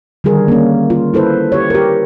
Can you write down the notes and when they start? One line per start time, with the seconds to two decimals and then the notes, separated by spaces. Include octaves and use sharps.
0.24 D3 D#3 G3 G#4 A#4
0.48 A#3 C#4
0.90 F4
1.14 E4 A4 B4 C5
1.52 G4 C#5
1.70 G4 A#4